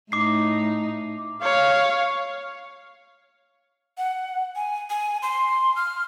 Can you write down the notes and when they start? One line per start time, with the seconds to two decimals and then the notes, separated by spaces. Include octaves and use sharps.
0.12 A2 D#4 D6 C7
1.42 C#5 F5
3.98 F#5
4.56 G#5
4.90 G#5
5.22 C6
5.76 F6